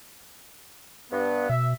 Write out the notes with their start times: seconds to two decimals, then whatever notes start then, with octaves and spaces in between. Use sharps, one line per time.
1.11 G2 B3
1.49 B2 E5